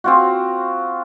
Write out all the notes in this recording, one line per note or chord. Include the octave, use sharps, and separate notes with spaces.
C4 F4 F#4